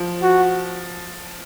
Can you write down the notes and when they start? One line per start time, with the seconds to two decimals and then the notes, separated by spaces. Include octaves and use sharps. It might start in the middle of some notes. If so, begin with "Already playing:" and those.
Already playing: F3
0.23 F#4